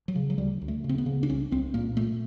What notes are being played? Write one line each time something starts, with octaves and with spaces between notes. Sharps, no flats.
F#3
C#3
F#3
D2 G3
D2
A3
C#3
C4
B3
C#3
D4
C2 C#4
C2 C4
A#2 A#3
A#2 A3